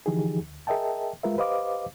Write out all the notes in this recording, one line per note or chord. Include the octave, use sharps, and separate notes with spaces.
D3 E3 F3 D#4 G4 G#4
D2
G#4 A#4 D#5 E5 G5 A5
G#3 F4 A#4 B4 E5
G4 B4 C5 D#5 F5 D6